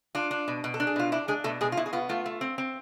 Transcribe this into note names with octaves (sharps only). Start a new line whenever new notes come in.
D4 F4
D4
B2
B2
A4
D4
G#4
B2 F4
D4 E4
G#3 D4 G#4
B2 A3 A4
B2 G#3 G#4
F4
B2 E4
G#4
B3 F4
A3 F4
A3
C4
C4